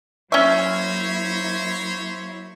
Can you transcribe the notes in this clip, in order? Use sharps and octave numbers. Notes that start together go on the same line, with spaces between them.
F#3 A#3 C#4 E4 C5 C#5 E5 C#6